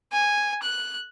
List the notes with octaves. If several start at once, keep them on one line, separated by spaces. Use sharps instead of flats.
G#5
F#6